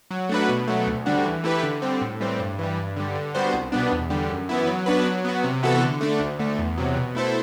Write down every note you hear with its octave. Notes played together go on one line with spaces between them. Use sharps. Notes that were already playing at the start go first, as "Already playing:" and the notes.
F#3
A3 D4 F#4 B4
B2
F#3 A3
D2
D3 G3 D4 F#4
E3
A3 E4 G4 B4
D3
G3 C4
A2
E3 G3 C4
G2
E3 G3
G2
D3 G3
D3
G3 B3 F#4 C5
C2
B2 G3 B3 D4
E2
D3 G3
F#2
E3 B3 E4
F#3
B3 D4 F#4 B4
F#3
B3 F#4
C3
E3 B3 F#4 A4
D3
A3 D4
D2
D3 A3
E2
C3 F#3
B2
A3 E4 A4 C5